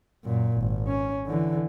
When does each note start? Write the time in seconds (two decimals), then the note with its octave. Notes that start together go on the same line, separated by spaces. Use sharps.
0.25 F#2 A#2
0.58 G#1
0.88 C#4
1.27 D3 E3